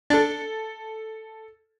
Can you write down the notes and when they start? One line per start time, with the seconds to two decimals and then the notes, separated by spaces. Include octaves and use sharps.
0.10 D4 A4 A6